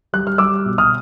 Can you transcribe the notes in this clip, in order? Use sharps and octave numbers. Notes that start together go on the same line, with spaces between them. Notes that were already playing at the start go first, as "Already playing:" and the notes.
G3 F#6
F6
G3 D6 E6
B2
D#6 F6